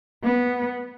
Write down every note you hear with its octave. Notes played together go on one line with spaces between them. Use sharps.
B3